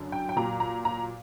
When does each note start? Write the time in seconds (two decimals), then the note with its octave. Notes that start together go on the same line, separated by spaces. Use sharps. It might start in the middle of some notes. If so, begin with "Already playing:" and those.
Already playing: F#2 D3 F#3
0.12 G5
0.29 G5
0.36 A#2 F#3 A#5
0.60 A#5
0.85 A#5